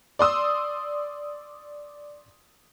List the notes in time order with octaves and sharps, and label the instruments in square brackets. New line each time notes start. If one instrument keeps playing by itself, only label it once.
[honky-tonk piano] D5 C6 D#6 E6